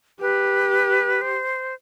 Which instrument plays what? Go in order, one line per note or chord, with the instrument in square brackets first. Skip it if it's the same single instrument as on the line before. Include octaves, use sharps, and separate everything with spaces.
[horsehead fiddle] G4 [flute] B4
[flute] C5